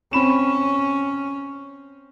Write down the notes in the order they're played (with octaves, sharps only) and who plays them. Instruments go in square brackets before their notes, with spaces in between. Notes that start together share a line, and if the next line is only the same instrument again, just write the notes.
[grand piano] C4 B5 E7 [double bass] C#4